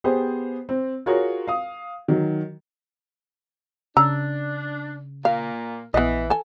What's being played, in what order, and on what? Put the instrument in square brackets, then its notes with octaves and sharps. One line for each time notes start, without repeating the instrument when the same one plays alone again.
[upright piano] B3 G4 G#4 C5
C4
F4 F#4 G#4 A#4 C#5
F5 D#6
D#3 F#3
[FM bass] C#3 [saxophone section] D4 [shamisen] A#5 [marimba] E6
[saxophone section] A#2 A#3 [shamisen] F5
[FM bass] A#1 [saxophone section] E3 [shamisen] B3 D#5
[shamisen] A4 G#5